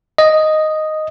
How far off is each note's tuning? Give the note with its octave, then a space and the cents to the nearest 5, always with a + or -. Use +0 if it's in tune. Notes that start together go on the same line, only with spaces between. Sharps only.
D#5 +0